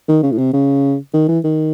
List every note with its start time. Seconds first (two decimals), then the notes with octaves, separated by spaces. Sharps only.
0.08 D#3
0.23 C#3
0.31 A2
0.38 C3
0.53 C#3
1.13 D#3
1.28 E3
1.44 D#3